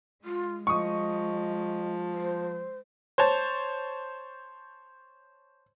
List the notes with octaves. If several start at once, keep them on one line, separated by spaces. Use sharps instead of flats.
G#3 F4
F3 D#5 C#6 D#6
C5
C5 C#5 A5